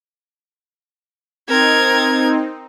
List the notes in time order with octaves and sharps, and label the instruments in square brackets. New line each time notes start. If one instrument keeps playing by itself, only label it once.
[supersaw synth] C4 D#4 [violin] A#4 G#6